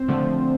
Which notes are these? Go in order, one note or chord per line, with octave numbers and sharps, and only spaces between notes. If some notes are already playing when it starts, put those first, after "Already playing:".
Already playing: C4 C5
D3 F3 A3